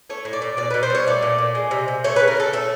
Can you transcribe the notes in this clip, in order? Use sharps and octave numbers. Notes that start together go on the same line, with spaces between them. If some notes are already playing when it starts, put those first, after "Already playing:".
A3 C#5
A2
D5
A2
B2 D5
B2 B4
C5
G3 C#5
A3 D5
A#2
A#2
G#3
C3
C3
A3 C#5
C#3 B4
A#4
C#3 A4
A3 A4